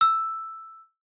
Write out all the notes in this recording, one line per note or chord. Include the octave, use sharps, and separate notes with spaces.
E6